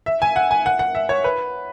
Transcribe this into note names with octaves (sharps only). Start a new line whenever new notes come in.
E5
G#5
F#5
G#5
F#5
F#5
E5
C#5
B4